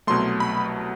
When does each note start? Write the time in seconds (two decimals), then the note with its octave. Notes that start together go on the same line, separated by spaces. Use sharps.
0.07 C2 B2 F#3 A3 C6
0.40 B5